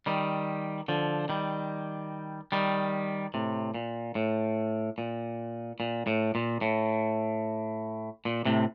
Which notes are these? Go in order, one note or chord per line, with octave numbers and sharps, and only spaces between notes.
D#3 G3
D3 F3
D#3 G3
D#3 G3
A2 C3
A#2
A2
A#2
A#2
A2
A#2
A2
A#2
A2 C3